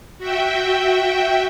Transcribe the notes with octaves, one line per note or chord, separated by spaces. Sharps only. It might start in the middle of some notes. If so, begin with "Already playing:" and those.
F#4 E5 G5